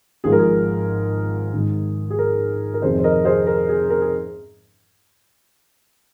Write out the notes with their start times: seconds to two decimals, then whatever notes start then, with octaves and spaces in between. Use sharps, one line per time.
0.24 G#1 G#2 F3 G#3 G#4
0.32 A#4
0.39 G#4
1.53 G#1 G#2 D#3
2.10 G#4
2.18 A#4
2.74 A#4
2.82 F2 C3 D#3 G#4 C5
2.99 C5
3.04 A#4 D#5
3.25 G#4 C5
3.47 A#4
3.69 G#4
3.90 A#4
4.01 G#4